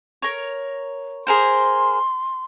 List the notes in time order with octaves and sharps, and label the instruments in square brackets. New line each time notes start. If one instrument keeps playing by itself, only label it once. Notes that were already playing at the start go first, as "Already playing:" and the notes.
[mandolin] A#4 C#5
[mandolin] G#4 A#4 C5 [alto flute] C6